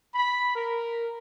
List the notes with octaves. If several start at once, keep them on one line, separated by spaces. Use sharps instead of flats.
B5
A#4